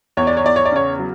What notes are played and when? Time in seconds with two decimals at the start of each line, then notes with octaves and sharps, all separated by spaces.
0.17 E2 C#5
0.27 D5
0.37 C#5
0.44 E2 D5
0.56 C#5
0.65 D5
0.72 C#3 C#5
0.99 F#3